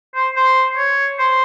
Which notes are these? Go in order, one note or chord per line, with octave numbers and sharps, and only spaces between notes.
C5
C5
C#5
C5